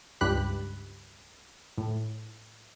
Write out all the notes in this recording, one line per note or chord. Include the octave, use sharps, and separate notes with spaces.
C#2 G2 G4 B5 F#6 B6
A2